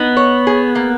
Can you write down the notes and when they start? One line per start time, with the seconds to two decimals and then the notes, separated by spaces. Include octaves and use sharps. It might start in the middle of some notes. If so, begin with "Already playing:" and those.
Already playing: B3 D#4
0.17 C#5
0.47 G#4
0.75 A#3